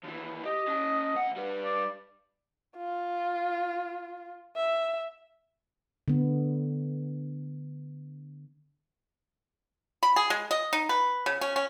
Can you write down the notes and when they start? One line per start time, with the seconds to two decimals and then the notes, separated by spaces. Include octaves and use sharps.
0.03 D#2 E3
0.45 G4 D#5
0.68 C#4 A5
1.14 D2 F#5
1.37 G3 B4
1.64 D5
2.78 F4
4.56 E5
6.08 D3 B3
10.03 B5
10.16 G#4
10.30 G#3
10.51 D#5
10.73 D#4
10.89 B4
11.26 C#3
11.41 C#4
11.56 C#4